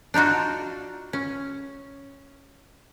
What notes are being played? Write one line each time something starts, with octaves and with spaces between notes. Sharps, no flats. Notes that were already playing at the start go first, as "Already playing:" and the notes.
D4 D#4 F4 F#4
C#4